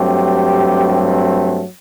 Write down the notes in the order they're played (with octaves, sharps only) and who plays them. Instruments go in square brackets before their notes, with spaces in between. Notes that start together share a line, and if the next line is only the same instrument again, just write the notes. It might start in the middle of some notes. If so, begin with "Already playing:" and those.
Already playing: [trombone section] G2 F#3 A3 C4 G4